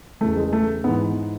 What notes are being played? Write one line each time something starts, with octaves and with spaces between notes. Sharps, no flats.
E2 C#3 E3 A3
G#3
A3
G#2 E3 B3